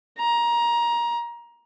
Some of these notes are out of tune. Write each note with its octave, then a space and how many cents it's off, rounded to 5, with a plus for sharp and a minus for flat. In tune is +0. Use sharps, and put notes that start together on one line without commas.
A#5 +20